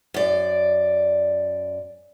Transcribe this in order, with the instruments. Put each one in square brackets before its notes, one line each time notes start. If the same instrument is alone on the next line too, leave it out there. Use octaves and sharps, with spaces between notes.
[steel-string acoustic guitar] F#2 D5